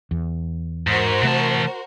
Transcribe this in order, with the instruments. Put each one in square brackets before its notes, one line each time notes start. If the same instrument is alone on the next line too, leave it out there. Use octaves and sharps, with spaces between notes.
[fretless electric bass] E2
[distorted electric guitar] G#2 [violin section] F#4 A#4 C5
[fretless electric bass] C3 A3 [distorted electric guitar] E3 A5